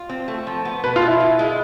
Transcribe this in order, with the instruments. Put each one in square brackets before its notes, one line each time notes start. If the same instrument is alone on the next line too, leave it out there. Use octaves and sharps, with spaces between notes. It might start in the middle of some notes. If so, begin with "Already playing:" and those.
Already playing: [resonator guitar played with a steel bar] F4
C4
A3
F3
B3
[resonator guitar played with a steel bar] B2 [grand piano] B4
[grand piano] F4
[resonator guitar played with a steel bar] B2
[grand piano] E4
[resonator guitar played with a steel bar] F4
G#3